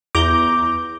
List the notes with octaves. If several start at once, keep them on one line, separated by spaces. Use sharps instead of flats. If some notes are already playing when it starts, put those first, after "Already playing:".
E2 A#5 D6 G6